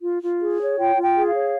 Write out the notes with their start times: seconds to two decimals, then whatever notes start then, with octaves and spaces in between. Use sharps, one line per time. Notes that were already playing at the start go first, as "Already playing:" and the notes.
0.03 F4
0.22 F4
0.40 G#4
0.60 C#5
0.78 F4 G5
0.96 F4
1.03 G5
1.16 G#4
1.28 F5
1.34 C#5